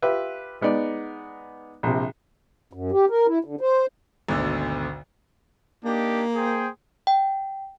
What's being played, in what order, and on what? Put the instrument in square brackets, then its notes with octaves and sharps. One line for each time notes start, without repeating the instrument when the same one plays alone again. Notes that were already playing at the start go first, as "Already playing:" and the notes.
[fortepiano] F4 G4 B4 E5
G#3 B3 D#4 D5 D6
A#1 C3
[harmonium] F#2
G4
A#4
E4
D3
C5
[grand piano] G#1 D2 B2 D3
[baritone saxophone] A#3 [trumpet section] D4 D#4 G4
[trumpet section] G#4 C5 G5
[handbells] G5